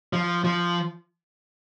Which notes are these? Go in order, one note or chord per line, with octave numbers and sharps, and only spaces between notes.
F3
F3